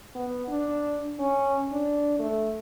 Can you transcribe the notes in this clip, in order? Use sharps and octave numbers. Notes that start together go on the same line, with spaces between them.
B3
D4
C#4
D4
A3